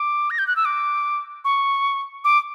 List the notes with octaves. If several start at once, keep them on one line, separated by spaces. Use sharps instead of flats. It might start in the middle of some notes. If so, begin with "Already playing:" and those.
Already playing: D6
A#6
G6
F#6
E6
D6
C#6
D6